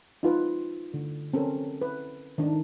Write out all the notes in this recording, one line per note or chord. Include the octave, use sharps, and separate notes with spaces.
D#4 F4 B4
D3
C4 C#4 A4 A#4
B4
D#3 D4 D#4